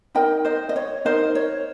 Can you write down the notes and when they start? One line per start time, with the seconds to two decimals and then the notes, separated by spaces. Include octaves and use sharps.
0.15 D#4 A#4 D#5 G5
0.45 C5 D#5
0.69 D#5
0.76 C#5
1.05 D#4 A#4 C5 D#5
1.35 C#5